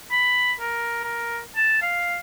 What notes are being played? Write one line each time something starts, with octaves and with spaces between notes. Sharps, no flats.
B5
A#4
A#4
A5
F5